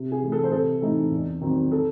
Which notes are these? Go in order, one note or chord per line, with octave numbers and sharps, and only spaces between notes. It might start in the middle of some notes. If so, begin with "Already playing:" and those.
Already playing: C3
G#4
E3 A3
A4
C5
C3 A4
E3 A3 C4 D#4
E2
D#3 F#3 C4 D#4
A4